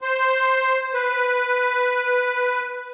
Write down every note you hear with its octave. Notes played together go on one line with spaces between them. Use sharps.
C5
B4